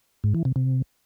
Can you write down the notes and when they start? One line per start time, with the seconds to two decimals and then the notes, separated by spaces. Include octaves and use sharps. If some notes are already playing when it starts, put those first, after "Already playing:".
0.24 G#2
0.34 E3
0.45 C3
0.56 C3